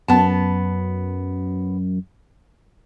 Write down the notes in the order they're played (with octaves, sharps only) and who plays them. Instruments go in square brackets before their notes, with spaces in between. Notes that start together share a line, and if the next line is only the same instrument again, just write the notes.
[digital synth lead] F#2 [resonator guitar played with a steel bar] B3 A5